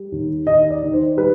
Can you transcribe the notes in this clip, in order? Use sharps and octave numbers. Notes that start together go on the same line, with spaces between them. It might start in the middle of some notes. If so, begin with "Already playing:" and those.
Already playing: G3
D#2
D#2 D#5
D5
D#3
C5
G3 B4